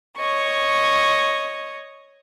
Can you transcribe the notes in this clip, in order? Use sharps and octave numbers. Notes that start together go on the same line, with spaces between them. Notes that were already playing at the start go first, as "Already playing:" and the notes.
C#5 D#5 C#6